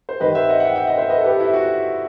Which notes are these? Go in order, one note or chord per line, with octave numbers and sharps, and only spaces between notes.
C5
G2 D#3 G3 B4 D#5
C5 E5
D#5 F#5
F#5
E5 G5
E5 G5
D#5 F#5
C5 E5
B4 D#5
A4
G4 B4
E4
F#4